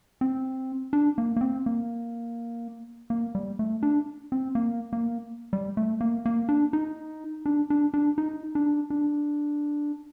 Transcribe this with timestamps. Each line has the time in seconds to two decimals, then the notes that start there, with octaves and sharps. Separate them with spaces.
0.21 C4
0.93 D4
1.18 A#3
1.36 A#3
1.41 C4
1.66 A#3
3.10 A#3
3.35 G3
3.59 A3
3.83 D4
4.32 C4
4.55 A#3
4.93 A#3
5.53 G3
5.77 A3
6.01 A#3
6.25 A#3
6.49 D4
6.73 D#4
7.46 D4
7.70 D4
7.94 D4
8.18 D#4
8.55 D4
8.90 D4